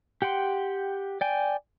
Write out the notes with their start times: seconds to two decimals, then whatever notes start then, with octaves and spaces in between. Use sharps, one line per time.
0.22 G4 F#5 G5 C6
1.21 D5 G5 G#5